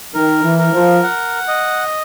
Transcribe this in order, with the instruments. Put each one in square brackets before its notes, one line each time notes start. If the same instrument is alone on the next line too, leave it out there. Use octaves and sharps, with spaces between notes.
[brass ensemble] D#3 [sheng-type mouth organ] A#4
[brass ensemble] E3
[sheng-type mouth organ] A#4
[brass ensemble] F3
[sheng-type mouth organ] F#5
D#5